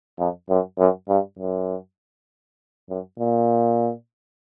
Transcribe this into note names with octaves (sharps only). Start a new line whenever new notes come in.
F2
F#2
F#2
G2
F#2
F#2
A#2